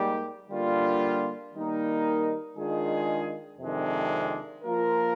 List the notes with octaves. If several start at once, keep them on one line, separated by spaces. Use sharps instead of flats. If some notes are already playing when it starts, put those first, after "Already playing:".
Already playing: G#2 G3 A#3 D#4 G4
D3 G3 A#3 D4 F4
D#3 G3 A#3 D#4 A#4
D#3 G#3 D4 F4 G#4
F2 C3 D#3 G#3 D4
F3 A#3 F4 A#4